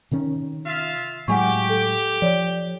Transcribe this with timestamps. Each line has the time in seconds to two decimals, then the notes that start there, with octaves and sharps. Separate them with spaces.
0.11 C3 D#3 C#4
0.65 F4 E5 F5
1.28 A2 F#3 G#3 G4 F#5 G#5 C#6
1.69 A4
2.22 F3 C#5 D5